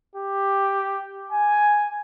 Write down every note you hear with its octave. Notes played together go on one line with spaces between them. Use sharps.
G4
G#5